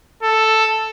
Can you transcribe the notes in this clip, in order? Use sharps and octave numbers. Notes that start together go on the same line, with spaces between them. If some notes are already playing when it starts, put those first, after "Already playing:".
A4